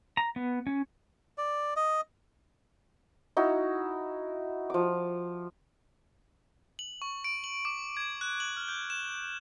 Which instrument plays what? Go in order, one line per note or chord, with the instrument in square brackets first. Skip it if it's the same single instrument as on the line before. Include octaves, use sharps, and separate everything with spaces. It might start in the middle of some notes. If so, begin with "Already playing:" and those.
[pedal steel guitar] A#5
B3
C#4
[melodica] D5
D#5
[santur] D#4 E4 F#4
F3 D6
[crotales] F#7
C#6
D7
F#7
D6
G#6
F#6
F#7
F6
G6
E7